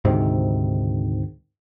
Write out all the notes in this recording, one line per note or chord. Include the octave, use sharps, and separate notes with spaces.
D2 G#2 C3 D#3